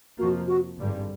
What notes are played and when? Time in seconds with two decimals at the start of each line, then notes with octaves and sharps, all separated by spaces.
0.19 F2 C3 F3 A#3 F#4
0.48 F#4
0.77 G#1 G2 D3 G3